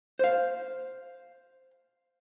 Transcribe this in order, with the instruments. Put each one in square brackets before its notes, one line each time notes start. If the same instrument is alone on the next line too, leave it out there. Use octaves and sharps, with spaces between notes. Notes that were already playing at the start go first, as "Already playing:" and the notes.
[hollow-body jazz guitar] C5 F5